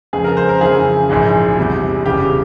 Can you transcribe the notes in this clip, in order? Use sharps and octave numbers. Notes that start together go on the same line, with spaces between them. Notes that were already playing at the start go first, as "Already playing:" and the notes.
F2 C#3 F3 G#3 G#4
A#4
C5
A#4
F2 C#3 E3 G#4
A#1 G#2 E3 G#3
E2 C3 G3
E1 E2 C#3 G3 G4